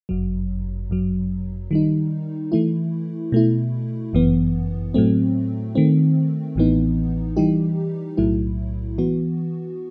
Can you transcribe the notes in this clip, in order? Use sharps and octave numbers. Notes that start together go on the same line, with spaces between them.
G1 F#2 F#3
G1 F#2 F#3
D#3 G3 D#4
E3 A3 E4
B2 A3 E4
G1 F#2 E3 B3
A2 F#3 A3 C4
D#3 A3 C4
A1 A2 E3 B3 D#4
E3 G3 D#4 G4
B1 A2 F#3 A3 E4
E3 B3 F#4